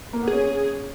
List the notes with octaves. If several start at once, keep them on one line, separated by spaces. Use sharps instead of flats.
A#3
B3
G#4
C#4